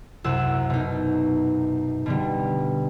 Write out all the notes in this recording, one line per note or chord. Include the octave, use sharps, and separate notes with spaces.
C2 F#2 F#5 E6
B2 D#4
B2 D3 G3